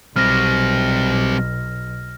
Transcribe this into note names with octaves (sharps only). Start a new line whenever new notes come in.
B1 G3 C4 F6 A#6